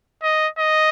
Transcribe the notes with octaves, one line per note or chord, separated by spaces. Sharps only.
D#5
D#5